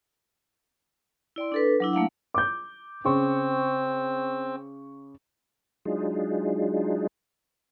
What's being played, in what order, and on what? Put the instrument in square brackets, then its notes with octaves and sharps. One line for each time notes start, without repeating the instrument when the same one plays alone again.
[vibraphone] E4 D5 G5 C6
D4 A4 B4
F#3 D4 E4
A3 A#3 F5 F#5
[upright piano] D6 G6
[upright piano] C#3 C#6 [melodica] C4
[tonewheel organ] F#3 G#3 D4 D#4 F4 G#4